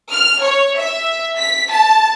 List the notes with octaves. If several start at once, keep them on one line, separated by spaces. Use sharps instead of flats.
F6
C#5
E5
B6
A5